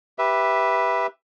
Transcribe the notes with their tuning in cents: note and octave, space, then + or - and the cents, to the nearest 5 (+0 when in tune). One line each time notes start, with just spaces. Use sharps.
G4 +0 B4 -10 E5 +0